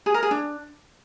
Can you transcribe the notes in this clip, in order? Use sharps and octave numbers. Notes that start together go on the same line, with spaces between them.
G#4
A#4
G#4
D4